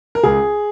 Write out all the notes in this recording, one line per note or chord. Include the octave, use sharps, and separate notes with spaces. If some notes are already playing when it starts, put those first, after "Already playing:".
A#4
C#2 G#4